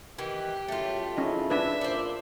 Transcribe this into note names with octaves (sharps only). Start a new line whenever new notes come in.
D#3 E3 G4
C#2 F#2 A2 A3 F4
F3 C#4 D#4 E4 G#4 D#5
D4 B4 E5
A#2 C5 D5